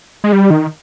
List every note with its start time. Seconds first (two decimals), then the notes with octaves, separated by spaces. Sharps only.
0.24 G#3
0.32 G3
0.50 D#3